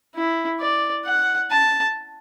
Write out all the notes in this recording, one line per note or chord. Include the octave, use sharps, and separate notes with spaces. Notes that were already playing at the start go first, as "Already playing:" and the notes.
E4
D5
F#5
A5